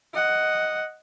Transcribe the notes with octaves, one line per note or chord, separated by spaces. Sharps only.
D#5 F#5